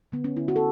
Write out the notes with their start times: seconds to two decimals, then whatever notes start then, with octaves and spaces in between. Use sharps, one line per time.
0.12 D3 B3
0.24 C#4
0.37 D3 E4
0.48 F#4
0.56 A4